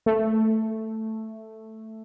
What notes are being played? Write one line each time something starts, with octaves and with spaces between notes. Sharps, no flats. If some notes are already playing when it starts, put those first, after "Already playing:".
A3